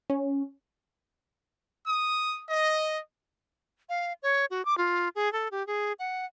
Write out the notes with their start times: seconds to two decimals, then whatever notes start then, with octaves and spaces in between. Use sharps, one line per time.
0.10 C#4
1.87 D#6
2.49 D#5
3.89 F5
4.23 C#5
4.51 F#4
4.65 D6
4.78 F4
5.16 G#4
5.33 A4
5.51 G4
5.67 G#4
5.99 F#5